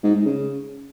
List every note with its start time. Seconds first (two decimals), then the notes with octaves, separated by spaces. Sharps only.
0.03 G#2
0.15 G#2
0.26 C#3